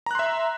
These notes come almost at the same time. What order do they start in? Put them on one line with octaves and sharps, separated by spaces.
A#5 F#6 C6 E5